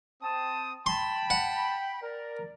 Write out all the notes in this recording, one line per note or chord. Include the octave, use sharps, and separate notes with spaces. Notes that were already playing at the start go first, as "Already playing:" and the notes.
C4 A5 D#6
G5 A5 B5 C6
F#5
A#4 D5